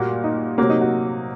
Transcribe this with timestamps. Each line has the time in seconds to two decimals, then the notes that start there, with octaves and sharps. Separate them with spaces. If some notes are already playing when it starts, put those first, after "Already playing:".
Already playing: A#2 G3 A#3 F#4
0.24 D#4
0.58 C3 F#3 A#3 F#4
0.69 D#4
0.81 F#4